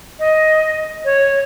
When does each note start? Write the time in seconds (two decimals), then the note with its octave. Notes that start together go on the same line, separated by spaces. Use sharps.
0.19 D#5
1.05 C#5